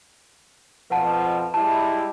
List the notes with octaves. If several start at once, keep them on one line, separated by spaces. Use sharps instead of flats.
F2 B2 F3 B4 F#5 A5
G3 G#3 E4 A5